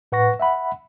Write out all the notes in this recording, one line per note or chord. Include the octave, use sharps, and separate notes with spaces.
A2 B4 F#5 C#6 A#6
E5 F#5 B5